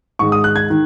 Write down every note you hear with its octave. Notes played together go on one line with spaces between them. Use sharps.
G#2 D#3 G#3 C#6
D#6
F#6
G#6
D#3